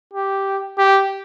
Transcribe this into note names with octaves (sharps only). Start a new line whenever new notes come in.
G4
G4